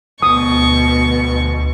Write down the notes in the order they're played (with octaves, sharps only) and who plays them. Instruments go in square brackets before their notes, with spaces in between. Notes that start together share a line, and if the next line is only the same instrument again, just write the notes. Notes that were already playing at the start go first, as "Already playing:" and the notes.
[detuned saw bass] D2 [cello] B2 B3 [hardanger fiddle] C#6 [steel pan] D#6